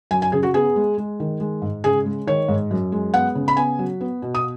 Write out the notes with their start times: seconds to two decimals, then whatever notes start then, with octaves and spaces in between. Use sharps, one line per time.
0.11 F#2 G#5
0.22 G#5
0.32 C#3 G#4
0.43 F#4
0.54 B3 G#4
0.76 G#3
0.98 G#3
1.20 D#3
1.40 G#3
1.62 G#2
1.84 C#3 G#4
2.06 G#3
2.27 D#3 C#5
2.48 G#2
2.71 F#2
2.92 G#3
3.14 B3 F#5
3.35 C#3
3.48 B5
3.57 B3 G#5
3.79 F#3
4.01 B3
4.22 B2
4.35 D#6